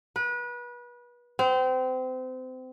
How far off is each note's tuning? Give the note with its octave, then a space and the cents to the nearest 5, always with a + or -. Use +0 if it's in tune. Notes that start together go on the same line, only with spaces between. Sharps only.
B4 -30
C4 -30